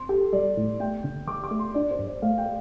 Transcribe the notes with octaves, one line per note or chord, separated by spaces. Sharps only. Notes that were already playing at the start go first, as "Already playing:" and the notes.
Already playing: C4 C6
G4 A4
G3 D5
A2
A3 G5
D3
D3 D6
D6
A3
C6
D4 D5
C5
G2
D5
A3 F5
G5
A3